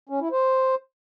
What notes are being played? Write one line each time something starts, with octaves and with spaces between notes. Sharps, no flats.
C#4
E4
C5